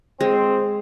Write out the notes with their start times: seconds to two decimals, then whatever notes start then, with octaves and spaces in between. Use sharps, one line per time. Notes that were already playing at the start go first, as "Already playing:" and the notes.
0.20 G#3 C4